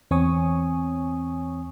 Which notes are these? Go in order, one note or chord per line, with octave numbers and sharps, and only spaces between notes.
E2 C4 C#5 G#5 C#6 D#6